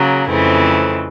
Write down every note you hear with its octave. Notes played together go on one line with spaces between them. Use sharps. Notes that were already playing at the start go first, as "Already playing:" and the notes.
Already playing: C#3 F#3 A#3
F2 C#3 E3 A3 C4